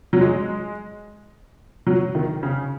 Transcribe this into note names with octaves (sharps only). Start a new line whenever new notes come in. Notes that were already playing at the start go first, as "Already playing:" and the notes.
F#3
G#3
F#3
D#3
C#3